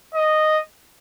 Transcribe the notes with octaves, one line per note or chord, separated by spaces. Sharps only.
D#5